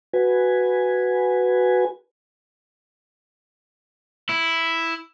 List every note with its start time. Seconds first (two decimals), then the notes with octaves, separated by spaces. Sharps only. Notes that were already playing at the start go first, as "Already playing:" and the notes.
0.13 F#4 B4 G#5
4.29 E4